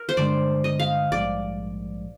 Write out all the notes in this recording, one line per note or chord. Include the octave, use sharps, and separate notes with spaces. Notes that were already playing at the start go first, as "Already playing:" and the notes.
Already playing: A#4
C5
G2 D3 G#3 D4 D5
D#5
F5
A#1 G#2 G3 D5